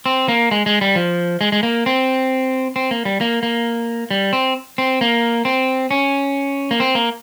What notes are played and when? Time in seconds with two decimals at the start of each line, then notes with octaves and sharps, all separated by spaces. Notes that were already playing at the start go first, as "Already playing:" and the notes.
0.06 C4
0.28 A#3
0.51 G#3
0.66 G#3
0.81 G3
0.95 F3
1.41 G#3
1.52 G#3
1.63 A#3
1.86 C4
2.76 C4
2.91 A#3
3.05 G3
3.21 A#3
3.43 A#3
4.11 G3
4.33 C4
4.78 C4
5.01 A#3
5.45 C4
5.91 C#4
6.71 A#3
6.80 C4
6.95 A#3